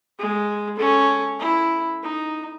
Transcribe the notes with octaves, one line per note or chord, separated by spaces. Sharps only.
G#3
C#4 A4
E4
D#4